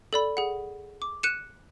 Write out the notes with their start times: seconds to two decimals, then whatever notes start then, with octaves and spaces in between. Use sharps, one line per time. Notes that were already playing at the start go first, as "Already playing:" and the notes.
0.13 A4 D5 B5
0.37 G#4 F#5
1.02 D6
1.23 F#6 C#7 D#7 E7